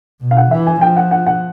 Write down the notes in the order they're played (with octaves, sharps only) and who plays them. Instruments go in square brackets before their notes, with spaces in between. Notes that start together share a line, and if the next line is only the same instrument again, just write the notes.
[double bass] B2
[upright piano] F5
F#5
[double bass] E3 [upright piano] E5
[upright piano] G#5
[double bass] F3 [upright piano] G5
[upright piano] F#5
F#5
F#5